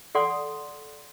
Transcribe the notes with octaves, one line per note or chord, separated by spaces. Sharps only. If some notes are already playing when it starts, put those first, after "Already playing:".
A4 D5 F#5 C6 D#6